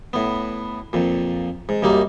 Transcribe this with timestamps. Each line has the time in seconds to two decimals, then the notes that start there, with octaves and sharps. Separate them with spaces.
0.13 A2 B3
0.93 F2 A#2
1.69 G#2
1.82 F#2 G3 A#3 D#4